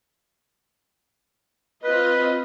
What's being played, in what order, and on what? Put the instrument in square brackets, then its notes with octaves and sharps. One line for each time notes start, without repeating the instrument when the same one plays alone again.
[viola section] C4 F4 D#5 [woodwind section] B4